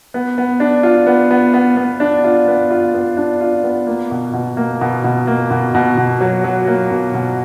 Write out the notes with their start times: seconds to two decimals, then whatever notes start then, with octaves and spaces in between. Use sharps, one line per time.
0.14 B3
0.38 B3
0.60 D4
0.83 F4
1.07 B3
1.31 B3
1.54 B3
1.77 B3
2.00 D4
2.24 F4
2.48 B3
2.71 F4
2.94 B3
3.17 D4
3.41 F4
3.63 B3
3.87 A#3
4.11 B2
4.33 B2
4.57 A#3
4.81 B2
5.04 B2
5.27 A#3
5.51 B2
5.75 B2
5.97 B2
6.21 F#3
6.44 F#3
6.67 A#3
6.91 B2
7.14 B2